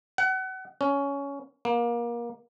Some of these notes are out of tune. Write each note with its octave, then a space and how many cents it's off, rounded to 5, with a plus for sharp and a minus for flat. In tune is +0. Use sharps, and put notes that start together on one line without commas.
F#5 +30
C#4 +15
A#3 +25